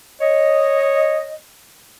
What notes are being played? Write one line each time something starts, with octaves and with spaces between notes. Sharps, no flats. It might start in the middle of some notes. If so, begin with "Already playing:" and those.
C#5 D#5